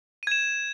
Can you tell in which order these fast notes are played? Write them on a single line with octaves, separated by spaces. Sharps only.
D#7 G#6 E7